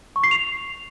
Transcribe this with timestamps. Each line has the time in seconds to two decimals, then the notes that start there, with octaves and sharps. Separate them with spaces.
0.16 C#6
0.24 C7
0.31 F7